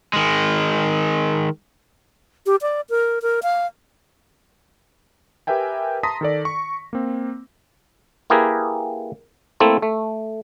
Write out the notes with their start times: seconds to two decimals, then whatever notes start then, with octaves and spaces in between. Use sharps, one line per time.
0.13 D#3 G#3
2.46 G4
2.62 D5
2.90 A#4
3.22 A#4
3.43 F5
5.47 G4 A#4 B4 E5 G5 G#5
6.03 A5 A#5 C6 D#6 A#6 B6
6.21 D#3 A4 D5
6.45 C#6
6.93 A#3 C4
8.30 A#3 E4 G4 G#4 A#4 B4
9.60 A3 A#3 C4 E4 A4
9.82 A3